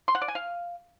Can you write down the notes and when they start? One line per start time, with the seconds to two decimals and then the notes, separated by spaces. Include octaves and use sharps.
0.08 C6
0.15 F#5
0.22 D5
0.28 G#5
0.35 F5